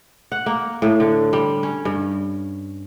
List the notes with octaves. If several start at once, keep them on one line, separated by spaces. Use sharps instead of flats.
F#5
A#3
A2
D3
G3
C#4
G2